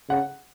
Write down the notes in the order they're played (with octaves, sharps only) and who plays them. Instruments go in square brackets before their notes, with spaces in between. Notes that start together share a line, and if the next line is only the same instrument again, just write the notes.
[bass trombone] C#3 [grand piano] F#5